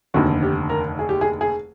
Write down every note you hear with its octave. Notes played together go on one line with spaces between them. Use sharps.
F1 D#2 D3 F#4
G4
A#4
G#4
G4
G#4
G#4